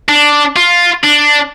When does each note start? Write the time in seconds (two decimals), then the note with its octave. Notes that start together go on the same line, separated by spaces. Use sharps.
0.09 D4
0.56 F4
1.04 D4